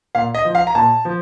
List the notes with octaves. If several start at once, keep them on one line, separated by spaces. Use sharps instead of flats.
A#2 F5
D#5
F3
F5
A#5
A#2 A5
F3